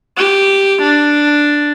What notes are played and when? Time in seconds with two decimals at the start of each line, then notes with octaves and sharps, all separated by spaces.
0.17 G4
0.82 D4